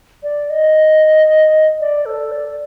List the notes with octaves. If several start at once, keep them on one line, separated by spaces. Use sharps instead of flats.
D5
D#5
D5
A4
D5